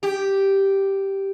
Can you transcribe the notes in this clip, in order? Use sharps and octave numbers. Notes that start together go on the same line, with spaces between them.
G4